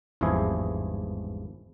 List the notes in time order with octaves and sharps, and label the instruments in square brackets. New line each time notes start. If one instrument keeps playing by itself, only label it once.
[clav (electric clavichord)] G#1 E2 G2 F3 E4 G#4